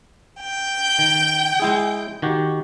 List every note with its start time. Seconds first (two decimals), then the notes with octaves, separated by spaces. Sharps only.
0.40 G5
0.99 D#3
1.60 G#3 E4 G#4
2.22 D#3 F#4 G4